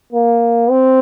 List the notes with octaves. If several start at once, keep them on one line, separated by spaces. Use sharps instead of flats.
A#3
C4